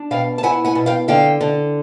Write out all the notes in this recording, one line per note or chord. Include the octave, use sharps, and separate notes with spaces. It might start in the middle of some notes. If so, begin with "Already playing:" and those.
Already playing: D4
B2 F5 G5
A5
E4 F#5 G#5
F#5 G#5
B2
F5 G5
D3 F5 G5
D3